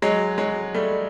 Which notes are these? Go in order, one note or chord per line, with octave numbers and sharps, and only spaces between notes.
F#3 G#3
F#3 G#3
G3 A3